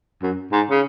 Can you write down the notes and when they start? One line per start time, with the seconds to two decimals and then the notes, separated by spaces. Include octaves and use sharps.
0.23 F#2
0.52 G#2
0.71 C#3